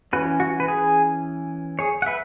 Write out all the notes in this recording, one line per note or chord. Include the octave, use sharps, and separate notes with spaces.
E3 C#4 F#4 B4
F#4
B4
G#4
G#4 C#5
F#5
B4 E5